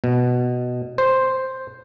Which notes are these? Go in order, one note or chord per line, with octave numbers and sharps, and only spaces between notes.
B2
C5